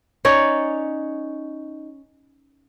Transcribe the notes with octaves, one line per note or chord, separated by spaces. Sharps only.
C#4 D#4 C#5 D5